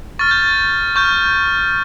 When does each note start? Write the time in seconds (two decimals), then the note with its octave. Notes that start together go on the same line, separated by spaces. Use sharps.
0.19 C#6 F6 A6
0.31 G6
0.42 A6
0.96 C#6 F6 G6